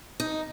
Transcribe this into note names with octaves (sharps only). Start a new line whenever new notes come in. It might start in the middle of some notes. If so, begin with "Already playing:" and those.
D#4